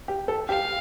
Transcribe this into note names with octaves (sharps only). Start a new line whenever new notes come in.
G4
A4
G4 F5